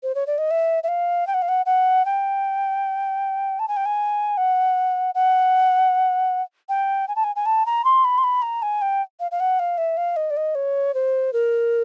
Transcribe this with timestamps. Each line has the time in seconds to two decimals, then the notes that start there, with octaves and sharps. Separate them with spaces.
0.03 C5
0.15 C#5
0.27 D5
0.38 D#5
0.51 E5
0.83 E5
0.88 F5
1.27 G5
1.34 F#5
1.42 F5
1.48 F#5
1.66 F#5
2.05 G5
3.59 A5
3.68 G#5
3.77 G5
3.85 G#5
4.37 F#5
5.14 F#5
6.69 G5
7.08 G#5
7.16 A5
7.24 G#5
7.36 G#5
7.46 A5
7.66 A#5
7.85 C6
8.04 B5
8.18 C6
8.24 B5
8.42 A#5
8.62 G#5
8.82 G5
9.20 F5
9.31 F5
9.40 F#5
9.59 F5
9.78 E5
9.97 F5
10.16 D#5
10.30 D5
10.37 D#5
10.55 C#5
10.94 C5
11.33 A#4